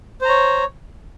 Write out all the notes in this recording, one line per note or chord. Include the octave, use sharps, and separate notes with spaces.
C5 C#5 A#5